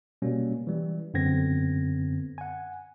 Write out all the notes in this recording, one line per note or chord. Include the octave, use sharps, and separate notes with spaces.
B2 G3 A#3 C#4
E3 G3
F#2 D3 B3 C4 G#6 A#6
F#5 G#5